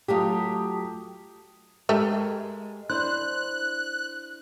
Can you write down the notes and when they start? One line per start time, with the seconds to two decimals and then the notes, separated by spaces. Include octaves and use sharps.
0.08 F#3 A3 F4 G4 A5 D#6
1.89 G#3 A3 G4 A#4 E5
2.90 D4 E4 C5 F#6